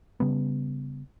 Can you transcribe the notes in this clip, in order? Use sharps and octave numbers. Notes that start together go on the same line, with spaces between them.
C#3 G3 B3